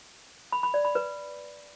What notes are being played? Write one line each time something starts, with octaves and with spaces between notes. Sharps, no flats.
B5
B5
D5
B5
B4